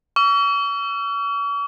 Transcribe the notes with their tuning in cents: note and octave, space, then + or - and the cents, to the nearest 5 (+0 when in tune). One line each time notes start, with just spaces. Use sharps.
C#6 +45 E6 +45